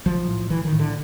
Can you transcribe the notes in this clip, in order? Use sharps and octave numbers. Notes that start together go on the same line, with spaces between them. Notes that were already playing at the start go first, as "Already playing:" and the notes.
B1 F3
A2
B1 E3
D#3
A2
D3